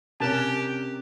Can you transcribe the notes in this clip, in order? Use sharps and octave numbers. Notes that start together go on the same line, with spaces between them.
C3 C#4 G4 A#4 A5 F#6